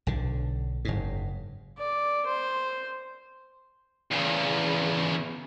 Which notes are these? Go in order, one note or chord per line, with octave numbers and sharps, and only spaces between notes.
B1 D3
F#1 G#2
D5
C5
E2 C#3